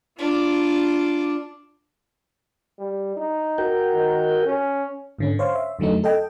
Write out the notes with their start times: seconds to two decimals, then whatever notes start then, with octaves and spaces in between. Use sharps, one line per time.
0.18 D4 F4 D6
2.79 G3
3.16 D#4
3.58 F#4 A#4 G5
3.93 D#3
4.45 C#4
5.18 G#2 D3 C#4
5.39 C5 C#5 F5 C6
5.55 E5
5.79 F2 D3 F#3 A3 D#4
6.04 A4 D#5 G5